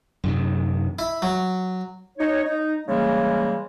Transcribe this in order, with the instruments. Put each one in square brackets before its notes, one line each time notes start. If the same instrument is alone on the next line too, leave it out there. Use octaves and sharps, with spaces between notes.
[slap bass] F#2 C3 D#3
[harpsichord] E4
F#3
[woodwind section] D#4 C#5
D#4
C#3 E3 G3 G#3 A#3